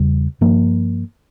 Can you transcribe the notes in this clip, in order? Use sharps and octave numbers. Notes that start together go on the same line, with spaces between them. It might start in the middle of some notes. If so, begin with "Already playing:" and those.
Already playing: E2 C#3 G3
G2 F3 A#3